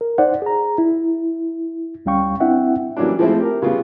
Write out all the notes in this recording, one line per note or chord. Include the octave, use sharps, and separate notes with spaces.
A#4
D#4 C5 D5 F#5
G#4 A#5
E4
D2 G3 C#4 F5 G5 C#6
C4 D4 E4 E5 F#5 G5
E3 F#3 G3 A#3 C#4 D4
F3 G#3 A3 C4 E4 F4
G4 A#4
C#3 G3 B3 F4